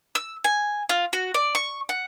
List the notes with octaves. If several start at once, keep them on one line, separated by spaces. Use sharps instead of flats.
E6
G#5
F4
F#4
D5
C#6
F#5